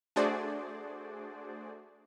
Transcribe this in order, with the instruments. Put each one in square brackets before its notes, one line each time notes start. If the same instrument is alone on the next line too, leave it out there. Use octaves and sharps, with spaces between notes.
[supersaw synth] A3 D4 F#4 G#4 C5 D5